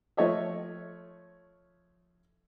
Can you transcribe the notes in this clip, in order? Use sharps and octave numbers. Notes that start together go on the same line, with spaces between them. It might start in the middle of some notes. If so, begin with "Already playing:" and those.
F3 A3 C#5 D#5 E5